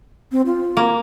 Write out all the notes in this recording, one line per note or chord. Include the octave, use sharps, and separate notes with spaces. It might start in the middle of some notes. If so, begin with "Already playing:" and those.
C4
F4
A#3